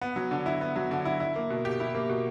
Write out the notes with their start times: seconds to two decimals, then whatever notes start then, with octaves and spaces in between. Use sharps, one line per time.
0.01 B3
0.16 F#3
0.31 D3
0.46 E4
0.61 B3
0.76 F#3
0.91 D3
1.05 E4
1.20 E4
1.36 A#3
1.50 B2
1.65 G4
1.80 E4
1.94 A#3
2.09 B2